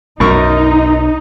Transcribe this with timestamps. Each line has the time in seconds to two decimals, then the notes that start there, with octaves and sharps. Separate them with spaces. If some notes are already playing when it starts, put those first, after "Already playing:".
0.20 B1 F#2 D#4 A#4 C#6